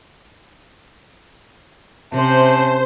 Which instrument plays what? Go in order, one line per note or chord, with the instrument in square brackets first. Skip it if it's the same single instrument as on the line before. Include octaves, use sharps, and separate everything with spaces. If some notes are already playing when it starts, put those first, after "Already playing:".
[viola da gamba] C3 [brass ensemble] C#4 E5 A5 [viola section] C5